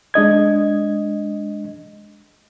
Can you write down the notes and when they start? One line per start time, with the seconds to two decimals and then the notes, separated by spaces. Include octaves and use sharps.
0.14 G#3 D4 D#5 G#6